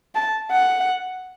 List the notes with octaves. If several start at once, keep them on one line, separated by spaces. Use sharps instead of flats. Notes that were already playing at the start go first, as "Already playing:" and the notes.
A5
F#5